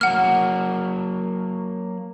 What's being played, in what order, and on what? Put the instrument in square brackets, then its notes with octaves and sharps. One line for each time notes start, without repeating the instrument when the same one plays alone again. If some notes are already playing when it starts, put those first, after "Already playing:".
[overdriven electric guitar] F#3 A#3 [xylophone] F#5 F6